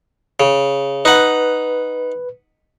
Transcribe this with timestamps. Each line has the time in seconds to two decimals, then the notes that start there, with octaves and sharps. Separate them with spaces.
0.40 C#3
1.05 D#4 B4 F#5